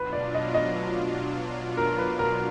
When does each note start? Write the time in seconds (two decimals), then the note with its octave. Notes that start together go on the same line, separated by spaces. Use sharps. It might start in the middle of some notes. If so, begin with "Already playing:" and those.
Already playing: B2 F#3 D4 F4 B4
0.13 D5
0.34 D#5
0.54 D#5
1.77 A#4
1.98 B4
2.19 A#4